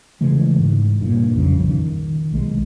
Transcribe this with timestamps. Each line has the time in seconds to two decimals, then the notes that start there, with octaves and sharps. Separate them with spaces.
0.21 C#3 E3 G#3 A3
0.59 G#2
1.01 G2 A#2
1.35 B1 F2 C#3
1.66 D#3
2.33 B1 G#3